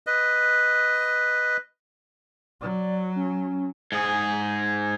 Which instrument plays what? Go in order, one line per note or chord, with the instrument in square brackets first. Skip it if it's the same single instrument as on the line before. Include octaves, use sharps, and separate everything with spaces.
[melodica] B4 D#5
[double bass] F#3 [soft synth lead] D5
[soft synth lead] C#4
[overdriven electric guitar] G#2 G#4